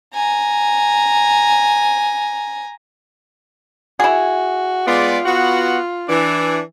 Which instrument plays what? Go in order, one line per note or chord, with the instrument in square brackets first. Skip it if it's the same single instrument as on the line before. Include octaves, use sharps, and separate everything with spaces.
[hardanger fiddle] G#5 A#5
[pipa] E4 G#4 [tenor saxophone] F#4
[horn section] G#3 B3 D5 [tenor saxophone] F4
[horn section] B3 F#4 F#5
E3 D4